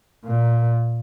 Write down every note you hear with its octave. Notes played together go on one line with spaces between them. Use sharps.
A#2